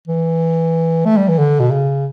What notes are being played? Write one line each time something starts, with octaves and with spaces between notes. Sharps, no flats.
E3
A3
G3
E3
D3
B2
C#3